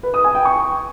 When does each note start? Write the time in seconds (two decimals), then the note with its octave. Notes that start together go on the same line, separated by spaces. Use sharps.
0.03 B4
0.14 D#6
0.24 G#5
0.35 G5
0.45 C#6